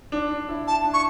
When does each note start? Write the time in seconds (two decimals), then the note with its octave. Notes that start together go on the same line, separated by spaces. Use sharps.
0.12 D4
0.31 D4
0.49 E4
0.67 A5
0.85 D4
0.94 C#6